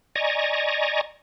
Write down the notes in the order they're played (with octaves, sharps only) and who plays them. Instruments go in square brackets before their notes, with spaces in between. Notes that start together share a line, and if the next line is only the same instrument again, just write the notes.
[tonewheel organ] D5 D#5 G#5 A#5 C#6